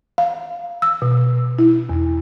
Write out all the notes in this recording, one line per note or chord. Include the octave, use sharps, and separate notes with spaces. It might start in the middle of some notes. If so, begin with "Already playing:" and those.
F5
E6
B2
E4
E2